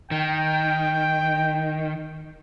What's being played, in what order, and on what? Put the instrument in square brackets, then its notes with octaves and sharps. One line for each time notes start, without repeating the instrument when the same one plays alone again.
[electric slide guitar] D#3 [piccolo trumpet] G5